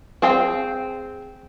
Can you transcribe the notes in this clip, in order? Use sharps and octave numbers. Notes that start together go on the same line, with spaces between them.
C4 G#4 F5 G5